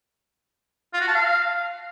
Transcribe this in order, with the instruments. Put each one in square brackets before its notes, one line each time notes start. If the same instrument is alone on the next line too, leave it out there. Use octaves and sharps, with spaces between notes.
[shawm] F4
F#4
A5
F5